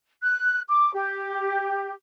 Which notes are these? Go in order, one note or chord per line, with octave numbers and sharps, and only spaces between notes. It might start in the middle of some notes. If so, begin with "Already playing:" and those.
F#6
D6
G4